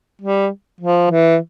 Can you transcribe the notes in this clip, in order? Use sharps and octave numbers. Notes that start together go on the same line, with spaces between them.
G3
F3
E3